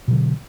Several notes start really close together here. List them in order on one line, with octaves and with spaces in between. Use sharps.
B2 F#3 D3